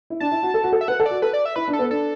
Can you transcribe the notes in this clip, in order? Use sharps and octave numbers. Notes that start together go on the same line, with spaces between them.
E4
D4 A5
E4
F#4
A4
F#4
A4
E5
B4 F#5
A4
D5
F#4
A4 B4
D5
E5
E4 B4
D4
A4
B3
D4 A4